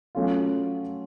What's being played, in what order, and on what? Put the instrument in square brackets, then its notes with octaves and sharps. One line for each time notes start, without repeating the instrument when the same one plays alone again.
[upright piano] F#3 A3 C#4 F4